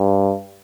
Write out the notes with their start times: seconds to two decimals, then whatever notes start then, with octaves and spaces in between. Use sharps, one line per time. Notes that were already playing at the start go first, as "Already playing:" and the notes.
Already playing: G2